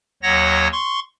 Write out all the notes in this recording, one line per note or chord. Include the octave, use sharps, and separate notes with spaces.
D#2 F#3 C#5 F#5 A#6
C6 C#6